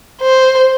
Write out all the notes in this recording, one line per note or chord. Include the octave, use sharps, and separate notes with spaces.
C5